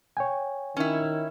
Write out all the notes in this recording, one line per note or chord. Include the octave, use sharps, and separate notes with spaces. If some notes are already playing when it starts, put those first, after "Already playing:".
C#5 G5 G#5
D#3 C#4 E4